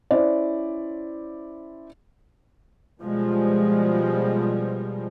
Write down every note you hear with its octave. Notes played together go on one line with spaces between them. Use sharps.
C#4 E4 C5 D5
B2 F3 G3 G#3